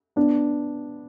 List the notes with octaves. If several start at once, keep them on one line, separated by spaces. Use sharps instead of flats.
B3 D4